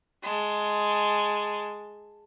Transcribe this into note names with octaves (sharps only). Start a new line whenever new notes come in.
G#3 A5